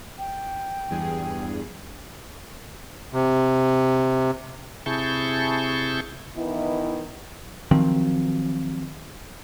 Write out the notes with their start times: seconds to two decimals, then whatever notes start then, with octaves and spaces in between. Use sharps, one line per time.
0.19 G5
0.90 E2 G2 G#4
3.13 C3
4.86 C3 E4 G#4 A5 C#6 G6
6.36 D#3 E3 B3 E4 D#5
7.71 D#3 F3 F#3 C4